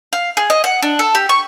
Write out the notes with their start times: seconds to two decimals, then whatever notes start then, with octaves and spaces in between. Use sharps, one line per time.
0.13 F5
0.37 G#4
0.50 D#5
0.64 F#5
0.82 D4
0.99 A4
1.15 G4
1.29 C#6